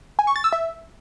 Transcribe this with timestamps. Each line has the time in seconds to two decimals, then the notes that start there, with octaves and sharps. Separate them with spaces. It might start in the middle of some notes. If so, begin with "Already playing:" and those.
0.19 G#5
0.27 C#6
0.36 A6
0.44 E6
0.53 E5